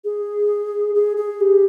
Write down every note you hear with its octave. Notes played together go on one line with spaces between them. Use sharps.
G#4
G#4
G#4
G4